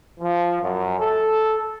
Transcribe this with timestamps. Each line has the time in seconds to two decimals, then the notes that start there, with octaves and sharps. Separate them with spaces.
0.19 F3
0.62 F#2
1.00 A4